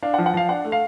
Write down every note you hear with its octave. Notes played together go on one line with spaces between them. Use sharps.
D4 F5
F#5
F3
F#5
F3 F5
D4 F#5
A3
F5